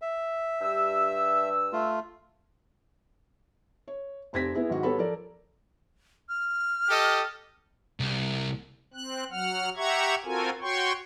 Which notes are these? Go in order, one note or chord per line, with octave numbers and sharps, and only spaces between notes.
E5
G2 E6
A3 F4
C#5
F1 C4 G4 G#6 A#6 B6
B3 E4 G#4
G#2 D#3 F#4
G3 B3 A4 C#5 B5
F3 A4 A#4 D5
F6
G4 A4 D#5
C2
C4 F#6
F#3 F#5 F6
G4 E5 F#5 A#5 C#6 G#6
C4 F4 F#4 A4 A#4 G#5
F#4 C#5 G5 C6 C#6